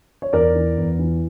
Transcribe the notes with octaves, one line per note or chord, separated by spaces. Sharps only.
C#5
E2 A#4 D5
E3
E2
E3